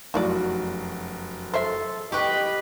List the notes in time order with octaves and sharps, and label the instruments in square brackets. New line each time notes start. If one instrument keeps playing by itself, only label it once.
[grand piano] F1 F#2 F#4 [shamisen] D#4 E4 D5
[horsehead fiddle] A4 [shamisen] C5 E5 [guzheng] C6
[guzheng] G4 B4 [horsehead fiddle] D#5 B5 [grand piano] C#6 D6